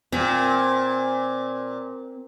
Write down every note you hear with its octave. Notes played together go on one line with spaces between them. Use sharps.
A#2 C4